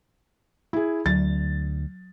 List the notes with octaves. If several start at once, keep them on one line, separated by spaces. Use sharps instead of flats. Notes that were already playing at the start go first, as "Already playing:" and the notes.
E4 G#4
D2 F#3 A6